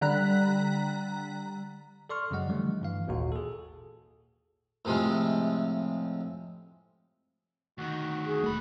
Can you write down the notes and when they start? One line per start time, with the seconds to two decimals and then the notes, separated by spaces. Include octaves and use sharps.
0.01 D3 G3 A#5 F#6 B6
2.09 A4 D5 C6 C#6 F6
2.31 F#2 C#3 F#3 G#3 D#5 F#5
2.48 D3 E3 F3 G3 A3
2.81 G2 E3 F5
3.07 G#1 D#2 A#2 F#4
3.32 G#4 A4
4.85 A2 C3 F3 G#3
7.78 D2 D#3 F#4
8.26 G#4
8.44 E1 G#3 A3 B5